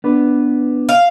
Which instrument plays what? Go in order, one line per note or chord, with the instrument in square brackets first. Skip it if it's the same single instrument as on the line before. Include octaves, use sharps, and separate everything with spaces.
[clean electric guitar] B3 D4 B4
[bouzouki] F5